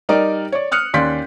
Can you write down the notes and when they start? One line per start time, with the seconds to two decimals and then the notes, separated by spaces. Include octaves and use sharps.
0.09 G3 D#4 G4 A#4 D5 D#5
0.52 C#5 D5
0.72 D#6 F6 F#6 C#7
0.94 D#2 C#4 D5 C6 G6 B6